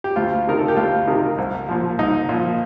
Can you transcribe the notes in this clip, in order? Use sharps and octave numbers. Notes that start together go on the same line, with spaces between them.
G4
D2 F4
C3 D#3 A#4
A4
G4
D2 F4
C3 D#3
C2
A#2 F3
C2 D#4
A#2 F3